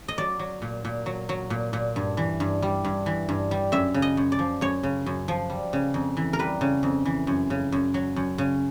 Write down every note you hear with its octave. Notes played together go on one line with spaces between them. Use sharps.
D#5
F#3 D5
F#3
A#2
A#2
F#3
F#3
A#2
A#2
G2
E3
G2
G3
G2
E3
G2
G3
F#2 E5
C#3
D#5
F#2
D5
F3
F#2 C#5
C#3
F#2
F3
G3
C#3
F2
E3
A#4
G3 B4
C#3
F2
E3
F#2
C#3
F#2
F#3
F#2
C#3